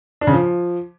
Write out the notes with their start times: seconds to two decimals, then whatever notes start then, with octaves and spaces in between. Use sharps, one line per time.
0.21 D4
0.27 C#3
0.33 F3